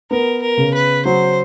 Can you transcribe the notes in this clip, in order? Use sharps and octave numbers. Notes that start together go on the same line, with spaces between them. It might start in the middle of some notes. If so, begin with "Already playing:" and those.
B3 A#4
A#4
C#3
B4
F#3 C5